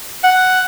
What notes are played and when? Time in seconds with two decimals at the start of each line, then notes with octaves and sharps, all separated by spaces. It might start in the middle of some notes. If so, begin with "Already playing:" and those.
0.24 F#5